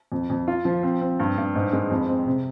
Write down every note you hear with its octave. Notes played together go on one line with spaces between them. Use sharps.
F2
F2
F4
F3
C4
C4
G2
G2
G#2
G#3
F2
C4
C3